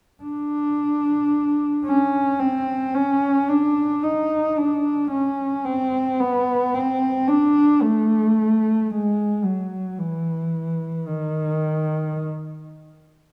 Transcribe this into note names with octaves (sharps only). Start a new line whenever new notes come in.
D4
C#4
C4
C#4
D4
D#4
D4
C#4
C4
B3
C4
D4
A3
G#3
F#3
E3
D#3